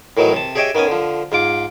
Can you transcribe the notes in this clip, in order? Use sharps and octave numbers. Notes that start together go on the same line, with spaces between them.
A2 D#3 E3 F#3 D#4
C3 A5
G4 G#4 C#5 D#5 E5 G5
D#3 B3 C#4 G#5 D#6
D3 F3
G#2 F4 D6